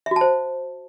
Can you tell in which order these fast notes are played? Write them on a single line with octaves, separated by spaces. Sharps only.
E5 F#4 A5 C5